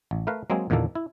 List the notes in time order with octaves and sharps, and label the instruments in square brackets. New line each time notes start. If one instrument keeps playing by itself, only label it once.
[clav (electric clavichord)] A1
A3 A#4 B4 F5
F#3 G#3 A#3 C4 G#4
E2 A#2 D3 D#3 A#3 A4
E4